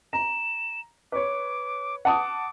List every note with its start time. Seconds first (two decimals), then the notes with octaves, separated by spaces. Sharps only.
0.13 A#5 E7
1.12 B4 C#5 D6
2.05 F#5 A5 D6 D#6